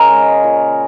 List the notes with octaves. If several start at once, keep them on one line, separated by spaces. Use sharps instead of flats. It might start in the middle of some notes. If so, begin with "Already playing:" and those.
Already playing: C#3 A#4 C#5 D#5
G#3
A#2